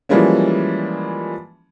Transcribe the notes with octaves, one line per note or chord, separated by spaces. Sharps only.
E3 F3 G3 G#3 A#3 C#4